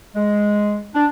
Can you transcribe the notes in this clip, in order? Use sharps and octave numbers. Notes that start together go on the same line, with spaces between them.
G#3
D4